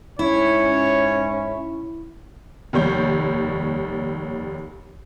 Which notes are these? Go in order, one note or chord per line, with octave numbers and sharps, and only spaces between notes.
G#2 C#4 E4 C#5
F1 D#2 G3 C#5 G6